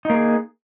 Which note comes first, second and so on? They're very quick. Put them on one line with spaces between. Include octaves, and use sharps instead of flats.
D#4 A#3 G#4